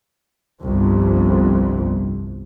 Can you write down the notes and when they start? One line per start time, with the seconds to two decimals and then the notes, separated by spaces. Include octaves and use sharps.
0.63 G1 C2 F2